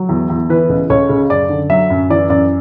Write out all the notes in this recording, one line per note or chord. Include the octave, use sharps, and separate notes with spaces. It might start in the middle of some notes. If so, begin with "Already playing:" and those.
Already playing: F#3
E2
E2
E3 B4
C#2
C#2 C#5
C#3
F#2 D5
D3
F#3 E5
F#2
E3 D5
F#2 D5